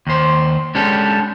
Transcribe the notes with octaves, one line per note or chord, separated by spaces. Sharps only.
D#2 C5
G#3 C#4 D4 G4 A4